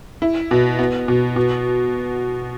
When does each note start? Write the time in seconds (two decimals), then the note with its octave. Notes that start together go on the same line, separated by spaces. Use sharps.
0.22 E4
0.51 B2
0.79 B3
1.08 B2
1.36 B2